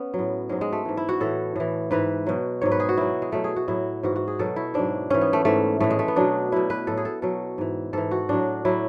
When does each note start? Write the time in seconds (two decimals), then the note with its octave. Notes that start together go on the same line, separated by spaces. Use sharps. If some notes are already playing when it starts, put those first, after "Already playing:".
Already playing: B3 C#4
0.14 A2 F#3
0.49 G#2 F#3 G#3
0.61 G#3
0.73 A3
0.85 G#2 E3
0.97 E4
1.09 F#4
1.20 A2 E3 A4
1.56 A2 E3
1.91 G#2 E3 B4
2.26 B2 F#3
2.61 G#2 F#3 C#5
2.72 B4
2.80 G#4
2.89 F#4
2.97 B2 F#3 E4
3.22 G#3
3.32 B2 F#3 A3
3.44 G#4
3.56 F#4
3.68 A2 F#3 E4
4.03 G#2 E3 F#4
4.16 F#4
4.28 G#4
4.39 B2 F#3 A4
4.56 E4
4.74 G#2 F#3 D4
5.10 G#2 E3 C#4
5.21 B3
5.33 A3
5.45 G#2 E3 A3
5.80 A2 E3 A3
5.90 G#3
5.99 A3
6.08 B3
6.16 B2 F#3 D4
6.52 B2 F#3 E4
6.70 B4
6.87 A2 F#3 A4
6.97 G#4
7.05 A4
7.22 B2 F#3 A4
7.58 G#2 E3
7.93 G#2 E3 A4
8.11 F#4
8.29 A2 F#3 D4
8.65 A2 F#3 E4